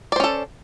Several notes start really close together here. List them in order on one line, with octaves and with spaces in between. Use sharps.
D5 C5 C#4 A4